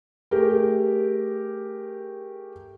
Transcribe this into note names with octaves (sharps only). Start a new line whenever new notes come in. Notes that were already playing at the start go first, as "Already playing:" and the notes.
A3 G4 G#4 A#4